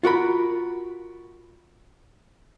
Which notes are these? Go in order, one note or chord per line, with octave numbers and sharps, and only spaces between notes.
F4 F#4 A#4 B5